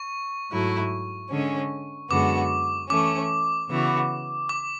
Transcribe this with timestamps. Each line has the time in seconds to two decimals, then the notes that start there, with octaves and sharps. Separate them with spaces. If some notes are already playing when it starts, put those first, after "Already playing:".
Already playing: C#6
0.50 G#2 F#3 A3 E4
1.31 D3 G#3 C#4
2.10 F#2 D3 G#3 B3 F#4 D6
2.90 E3 A3 C#4 D6
3.70 C#3 E3 B3 F#4
4.49 D6